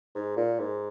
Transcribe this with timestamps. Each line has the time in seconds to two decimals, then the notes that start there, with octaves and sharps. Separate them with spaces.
0.15 G#2
0.37 A#2
0.59 G#2